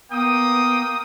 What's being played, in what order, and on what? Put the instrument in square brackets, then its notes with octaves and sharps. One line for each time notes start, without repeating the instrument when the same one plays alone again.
[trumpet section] A#3 G5 D#6 [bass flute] B3